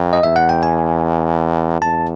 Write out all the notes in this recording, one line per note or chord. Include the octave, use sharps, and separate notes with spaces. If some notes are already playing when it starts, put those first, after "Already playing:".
Already playing: F2
D#5
E2 E5
F#5
G5
G#5
E2 A5